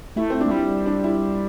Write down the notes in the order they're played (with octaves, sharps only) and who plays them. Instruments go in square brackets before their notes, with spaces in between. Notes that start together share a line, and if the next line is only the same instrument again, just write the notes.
[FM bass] A3 [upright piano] E4
[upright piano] C4
D4
[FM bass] A3
[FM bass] G3 [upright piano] E4
[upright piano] D4
E4